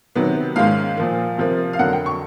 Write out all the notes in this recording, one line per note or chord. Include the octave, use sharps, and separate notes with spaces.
C3 D#3 F#3 B3
G#2 D#3 G#3 C#4 F5
A#2 F3 A#3
C3 F3 A#3
F5
F2 D3 F#3 A#3 F#5
G5
C#6